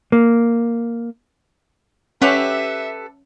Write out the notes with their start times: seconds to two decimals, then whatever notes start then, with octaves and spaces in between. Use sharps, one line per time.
0.12 A#3
2.22 C#4 G4 A4 B4 E5 F#5